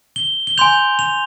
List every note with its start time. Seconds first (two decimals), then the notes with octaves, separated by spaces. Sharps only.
0.16 G7
0.47 G7
0.58 G#5 C6 G6 F7
0.99 F7